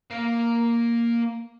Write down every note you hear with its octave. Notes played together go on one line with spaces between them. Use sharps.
A#3 F5